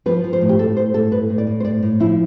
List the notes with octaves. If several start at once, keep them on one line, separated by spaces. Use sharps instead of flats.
F3 B4
F3
C5
A2
G4
A2 A4
A2 C5
A2 A4
A2 B4
A2
D5
A2
C5
A2 D5
A2
F3 E4